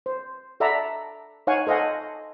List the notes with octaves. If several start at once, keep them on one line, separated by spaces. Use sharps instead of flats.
C5
A4 D5 E5 F#5 A#5 B5
D#4 C#5 F5 F#5 G#5 C#6
A4 C5 D#5 F5 F#5 G#5